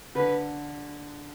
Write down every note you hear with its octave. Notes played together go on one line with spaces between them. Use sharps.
D3 B4